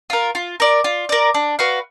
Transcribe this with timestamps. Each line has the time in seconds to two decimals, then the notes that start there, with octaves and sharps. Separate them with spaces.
0.10 F4 A#4
0.35 F4
0.60 A#4 D5
0.84 F4
1.09 A#4 D5
1.34 D4
1.59 F#4 B4 F5